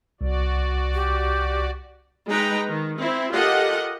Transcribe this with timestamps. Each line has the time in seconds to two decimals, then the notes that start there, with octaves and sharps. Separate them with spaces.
0.21 C2 F#4 D5
0.94 G4
2.28 G#3 D#4 B4 G5 A#5
2.69 D#3
3.00 C4 E4
3.32 F4 G4 A4 A#4 D#5 F#5